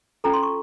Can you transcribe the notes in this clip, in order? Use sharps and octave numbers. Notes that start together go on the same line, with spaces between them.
C#4 F4 A4 A#5
C6
C#6